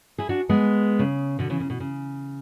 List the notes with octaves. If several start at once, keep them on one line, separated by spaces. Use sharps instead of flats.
E4 G#4
D4 F#4
G#3 B3
C#3
B2 D3
C#3 E3
C#3
B2
C#3